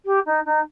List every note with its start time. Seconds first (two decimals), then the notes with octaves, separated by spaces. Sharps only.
0.05 G4
0.26 D#4
0.46 D#4